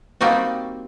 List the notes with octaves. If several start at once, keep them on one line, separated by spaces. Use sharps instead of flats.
G3 A#3 C4 D#4 F#4